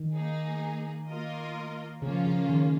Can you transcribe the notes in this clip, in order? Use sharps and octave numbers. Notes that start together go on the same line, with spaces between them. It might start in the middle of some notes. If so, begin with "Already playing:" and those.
Already playing: D#3
A#3 D#4 G#4
A#3 F4 A#4 D#5
C#3 F3 A#3 C#4 F4
C#3
D#3